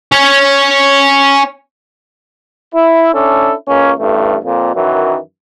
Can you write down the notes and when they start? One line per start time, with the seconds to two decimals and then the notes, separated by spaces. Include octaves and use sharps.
0.12 C#4 C#5
2.75 E4
3.14 C#4 D4 E4 A4
3.68 C#2 A#3 C#4
3.99 A1 G2 A3
4.44 F2 A#2
4.75 F#2 D#3 E3 F#3